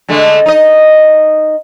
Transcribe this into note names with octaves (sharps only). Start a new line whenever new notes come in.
D3 G#3 A3
D#4 D#5